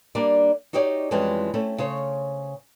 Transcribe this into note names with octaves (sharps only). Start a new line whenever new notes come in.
G3 A#3 D4 D5
D#4 F#4 G4 C#5 D5
F2 E3 G3 G#3 C4 C#4
A3 C4 C#4
C#3 C5 C#5